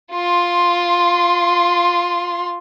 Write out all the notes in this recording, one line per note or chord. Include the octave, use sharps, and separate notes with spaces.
F4 C6